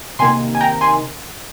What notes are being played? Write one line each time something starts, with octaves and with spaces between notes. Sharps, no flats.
C3 D#3 A#3 G#5 C6
G#5
G5 A#5
G#5 C6